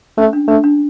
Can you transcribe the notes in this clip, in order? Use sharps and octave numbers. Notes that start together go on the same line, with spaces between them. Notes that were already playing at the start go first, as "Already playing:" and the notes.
A3 C#4
D4
A3 D4
D4